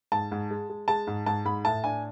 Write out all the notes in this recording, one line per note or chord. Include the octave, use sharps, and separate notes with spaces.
G#2 A5
G#2
G#3
G#3
G#3 A5
G#2
G#2 A5
G#2 B5
A2 A5
D4 G#5